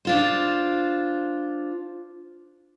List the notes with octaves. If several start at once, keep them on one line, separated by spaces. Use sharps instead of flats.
D4 F4 C5